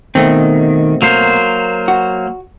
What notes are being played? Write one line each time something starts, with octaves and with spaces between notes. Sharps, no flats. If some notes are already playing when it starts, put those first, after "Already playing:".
B2 D#3 A3 C4
F#3 A#3 C5
F#4